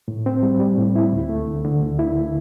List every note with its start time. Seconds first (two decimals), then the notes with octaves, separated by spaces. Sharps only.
0.08 A2
0.26 C4
0.43 G3
0.60 G3
0.78 A2
0.95 E4
1.12 D2
1.29 A3
1.47 D3
1.65 D3
1.82 D2
1.99 E4